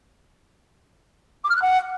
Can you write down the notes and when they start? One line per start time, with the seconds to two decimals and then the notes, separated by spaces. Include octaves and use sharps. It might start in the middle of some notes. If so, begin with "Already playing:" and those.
1.43 D6
1.49 F6
1.55 F#6
1.61 F#5